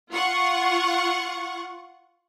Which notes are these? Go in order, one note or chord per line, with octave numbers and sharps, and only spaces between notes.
F4 F#5 C#6